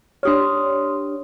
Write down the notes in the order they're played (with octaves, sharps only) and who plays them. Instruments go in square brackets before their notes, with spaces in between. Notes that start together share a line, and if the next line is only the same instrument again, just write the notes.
[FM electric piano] D4 G4 C#5 [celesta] C6 D#6 F6